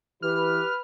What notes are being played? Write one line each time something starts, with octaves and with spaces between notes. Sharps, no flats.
E3 G4 B4 F6